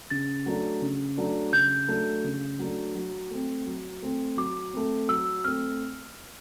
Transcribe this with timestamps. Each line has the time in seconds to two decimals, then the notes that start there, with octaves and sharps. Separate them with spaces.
0.10 C#3 A6
0.46 F#3 A3 D4
0.82 C#3
1.17 F#3 A3 D4
1.53 C#3 G6
1.88 F#3 A3 D4
2.24 C#3
2.59 F#3 A3 D4
2.95 F#3
3.31 A3 C4
3.66 F#3
4.02 A3 C4
4.37 F#3 D6
4.74 A3 C4
5.09 F#3 E6
5.44 A3 C4 F6